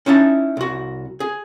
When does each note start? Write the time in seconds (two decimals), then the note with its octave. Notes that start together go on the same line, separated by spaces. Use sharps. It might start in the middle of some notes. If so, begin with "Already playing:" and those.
0.06 C#4 D#4 E4 E5 F5 A5
0.57 C2 F#4
1.20 G#4